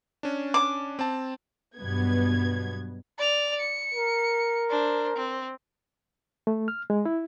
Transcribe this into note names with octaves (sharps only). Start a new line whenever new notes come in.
C#4 D4
D6
C4 A5
G2 B2 F#3 B3 G#6
D5 F7
C#7
A#4
D4 C5
C4
A3
F6
G#3
E4